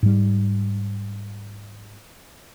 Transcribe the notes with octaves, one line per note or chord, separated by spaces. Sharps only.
G#2 G3